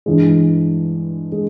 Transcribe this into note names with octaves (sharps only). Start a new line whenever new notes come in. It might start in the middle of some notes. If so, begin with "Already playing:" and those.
G2 E3 G#3
G#3